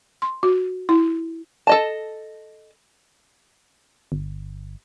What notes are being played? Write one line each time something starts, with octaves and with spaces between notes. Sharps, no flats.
C6
F#4
E4
A4 D#5 A5
G1